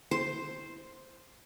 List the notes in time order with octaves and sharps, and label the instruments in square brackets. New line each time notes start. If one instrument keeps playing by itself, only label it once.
[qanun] C5